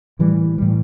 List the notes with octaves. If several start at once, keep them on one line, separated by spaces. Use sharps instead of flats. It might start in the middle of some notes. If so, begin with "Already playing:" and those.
A2 E3 G3
A2 E3 G3